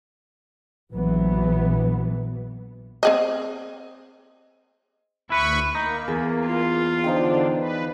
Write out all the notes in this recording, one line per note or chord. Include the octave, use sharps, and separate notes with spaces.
A#1 E3 F#3 B3
C4 G#4 D#5
D2 E4 B4 B5 C#6
A#3 D#4
E2 G#4
F4
D3 F3 D4 D#4 G5
B4